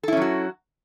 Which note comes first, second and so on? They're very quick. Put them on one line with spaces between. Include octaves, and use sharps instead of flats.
A4 E4 C#4 F#3 F#4